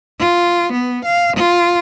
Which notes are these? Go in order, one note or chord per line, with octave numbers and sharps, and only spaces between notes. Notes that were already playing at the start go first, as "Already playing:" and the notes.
F4
B3
F5
F4